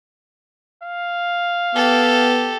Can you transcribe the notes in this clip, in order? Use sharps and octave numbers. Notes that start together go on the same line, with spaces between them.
F5
B3 G4 A4